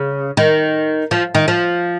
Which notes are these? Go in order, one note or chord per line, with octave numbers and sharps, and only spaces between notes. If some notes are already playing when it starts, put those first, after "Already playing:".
Already playing: C#3
D#3
F3
D#3
F3